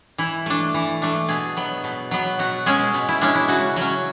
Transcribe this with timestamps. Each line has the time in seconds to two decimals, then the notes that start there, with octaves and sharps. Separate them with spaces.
0.18 E3 E4
0.46 A3 D4
0.74 E3
1.02 A3 D4
1.28 B2 G#4
1.57 F#3 B3
1.84 B2
2.11 F#3 B3
2.39 B2 F#4
2.66 G#3 C#4 G#4
2.94 B2
3.09 E4
3.21 G#3 C#4 D4
3.35 E4
3.49 C#3 F#4
3.76 F#3 C#4 F#4